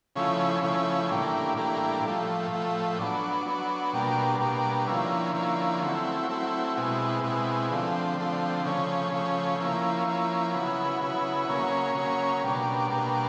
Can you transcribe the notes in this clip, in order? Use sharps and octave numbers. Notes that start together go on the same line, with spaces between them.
C#3 F3 A3 C#4 E4
C#3 F3 A3 C#4 E4
A2 E3 G3 A#3 D4
A2 E3 G3 A#3 D4
A2 F3 A3
A2 F3 A3
F#3 B3 D4
F#3 B3 D4
B2 G3 A#3 D4
B2 G3 A#3 D4
D3 F3 A#3 C#4 E4
D3 F3 A#3 C#4 E4
F#3 A3 C4 E4
F#3 A3 C4 E4
B2 G#3 C4 E4
B2 G#3 C4 E4
D3 F3 A3 C4
D3 F3 A3 C4
C#3 F3 A3 C#4
C#3 F3 A3 C#4
F3 A#3 C#4 E4
F3 A#3 C#4 E4
C#3 F#3 B3 E4
C#3 F#3 B3 E4
C#3 F#3 A#3 C#4
C#3 F#3 A#3 C#4
B2 G3 A#3 D4
B2 G3 A#3 D4